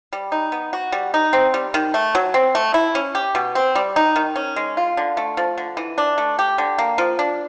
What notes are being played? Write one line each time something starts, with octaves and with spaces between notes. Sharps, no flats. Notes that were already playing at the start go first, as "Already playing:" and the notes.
G3
D#4
B3
F#4
G3
D#4
C4
G3
D#3
A3
F#3
C4
A3
E4
C#4
G4
B2
C4
G3
D#4
D#3
C#4
G#3
F4
D3
A3
F3
D3
E3
D4
A3
G4
D3
A#3
F3
D4